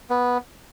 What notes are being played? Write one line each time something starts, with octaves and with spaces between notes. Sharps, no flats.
B3